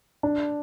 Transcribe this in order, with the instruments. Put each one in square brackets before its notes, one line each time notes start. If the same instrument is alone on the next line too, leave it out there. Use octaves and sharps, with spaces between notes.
[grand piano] D4